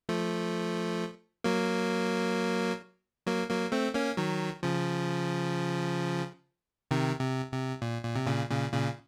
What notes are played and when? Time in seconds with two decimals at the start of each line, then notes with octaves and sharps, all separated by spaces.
0.09 F3 A3
1.44 F#3 A#3
3.27 F#3 A#3
3.50 F#3 A#3
3.72 A3 C4
3.95 A#3 C#4
4.17 D#3 F#3
4.63 C#3 F3
6.91 C3 D#3
7.20 C3
7.52 C3
7.82 A#2
8.04 A#2
8.16 C3
8.27 A#2 C#3
8.50 A#2 C#3
8.72 A#2 C#3